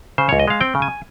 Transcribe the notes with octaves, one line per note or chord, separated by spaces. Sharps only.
C#3 C5
C#2 C#5
D#5
G#3 F5
C4 G5
C#3
G#5